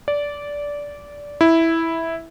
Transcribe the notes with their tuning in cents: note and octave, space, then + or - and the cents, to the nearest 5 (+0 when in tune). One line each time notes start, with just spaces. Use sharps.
D5 -15
E4 -5